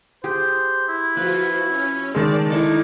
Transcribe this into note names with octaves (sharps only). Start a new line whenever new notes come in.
G4 G#4 C5
E4
F3 F4 F#4 B4
C#4
D#3 G#3 D5 A5
D#4 E4 A4 D5